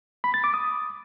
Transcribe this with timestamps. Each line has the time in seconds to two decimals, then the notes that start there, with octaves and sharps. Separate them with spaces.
0.24 B5
0.34 A6
0.44 D6
0.54 D#6